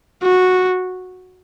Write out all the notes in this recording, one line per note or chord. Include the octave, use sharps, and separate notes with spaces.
F#4